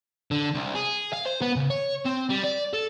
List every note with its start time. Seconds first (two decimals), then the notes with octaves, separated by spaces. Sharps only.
0.31 D3
0.55 C2
0.75 G#4
1.13 F5
1.26 C5
1.42 B3
1.56 C#3
1.70 C#5
2.06 C4
2.30 G3
2.44 D5
2.74 A4